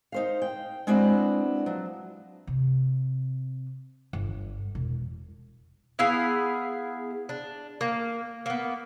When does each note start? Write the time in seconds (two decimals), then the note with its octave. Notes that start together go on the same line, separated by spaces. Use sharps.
0.12 D#4 C5 F5
0.42 G5
0.87 G#3 B3 C4 D4 E4 F#4
1.66 F3 F#3
2.47 C3
4.13 G1
4.75 E1
5.99 B3 E4 G#4 F5
7.29 D4
7.81 A#3
8.46 A#3 B3